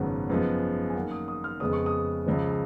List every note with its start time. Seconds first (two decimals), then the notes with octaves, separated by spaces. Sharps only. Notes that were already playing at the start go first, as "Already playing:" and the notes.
Already playing: G#1 F#2 C#3 F#3 B3 F#5
0.30 F#2 F3 G#3 B3
0.90 G#5
0.95 F#2 D#3 A#3 F#5
1.11 D#6
1.28 D#6
1.44 F6
1.60 F2 C#3 G#3 B3 D#6
1.73 C#6
1.86 D#6
2.26 C#2 C#3 F3